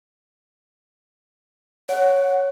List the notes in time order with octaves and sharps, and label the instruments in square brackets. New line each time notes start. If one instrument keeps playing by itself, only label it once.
[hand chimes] C#5 [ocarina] F#5